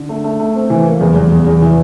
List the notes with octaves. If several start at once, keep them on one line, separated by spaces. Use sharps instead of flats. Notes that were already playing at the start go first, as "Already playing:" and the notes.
Already playing: D3
A3
A3
A3
C4
E3
A#3
E2
E2
E2
E2
E3